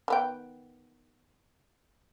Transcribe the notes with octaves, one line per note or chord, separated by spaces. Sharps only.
D#3 B3 G5